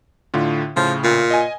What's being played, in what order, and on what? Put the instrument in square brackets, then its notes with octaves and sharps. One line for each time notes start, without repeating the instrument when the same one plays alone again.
[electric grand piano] A2 D3 F4
[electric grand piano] A2 C#3 [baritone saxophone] F3
[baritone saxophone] A#2
[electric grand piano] D#5 G#5